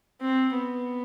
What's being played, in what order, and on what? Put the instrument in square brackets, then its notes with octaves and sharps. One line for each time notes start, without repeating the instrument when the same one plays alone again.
[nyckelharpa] C4
B3